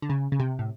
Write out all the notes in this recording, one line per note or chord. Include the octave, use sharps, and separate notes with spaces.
D3
C#3
C#3
C3
A2